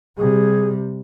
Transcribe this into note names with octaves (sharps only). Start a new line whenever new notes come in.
C3 G3 G#4